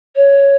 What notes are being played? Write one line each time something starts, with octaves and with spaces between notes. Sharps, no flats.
C#5